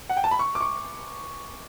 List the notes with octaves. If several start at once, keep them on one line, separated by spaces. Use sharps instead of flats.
F#5
G5
A5
B5
C#6
D6
C#6